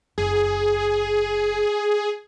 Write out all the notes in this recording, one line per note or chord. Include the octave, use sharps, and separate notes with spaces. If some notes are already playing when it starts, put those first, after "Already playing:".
F#1 G#4